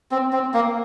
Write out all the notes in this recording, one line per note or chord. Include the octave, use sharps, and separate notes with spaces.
C4
C4
A#3